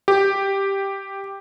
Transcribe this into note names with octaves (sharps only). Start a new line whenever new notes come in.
G4